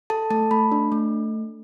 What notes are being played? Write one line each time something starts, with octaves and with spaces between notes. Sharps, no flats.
A4 A5
A3 A5
A3 B5
D4
A3